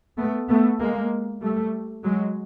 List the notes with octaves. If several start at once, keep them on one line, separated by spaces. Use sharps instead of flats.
A3 B3
A3 B3
G#3 A#3
G3 A3
F#3 G#3